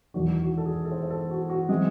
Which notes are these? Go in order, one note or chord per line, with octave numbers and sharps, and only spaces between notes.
E1 E2 D#3 F#4
F#4
A4
G#4
A4
C5
C5
A4
F#4
F#4
E3 G#3 C4 G#4